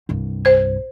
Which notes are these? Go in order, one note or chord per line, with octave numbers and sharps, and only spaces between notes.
C2 G2
C5 G#6